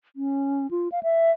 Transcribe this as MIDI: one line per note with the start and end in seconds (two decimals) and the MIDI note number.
0.16 0.70 61
0.71 0.89 65
0.92 1.00 77
1.03 1.31 76